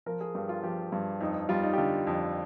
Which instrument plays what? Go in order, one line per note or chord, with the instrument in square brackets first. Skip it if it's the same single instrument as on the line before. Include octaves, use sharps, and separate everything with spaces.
[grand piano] F3 A#4
G#4
G2 G4
F4
F3 G4
G2
F2 D#4
G3 F4
D#4
G4
D3 F4
F2